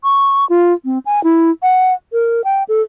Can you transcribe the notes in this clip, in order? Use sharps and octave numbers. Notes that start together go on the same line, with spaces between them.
C#6
F4
C4
G#5
E4
F#5
A#4
G5
A4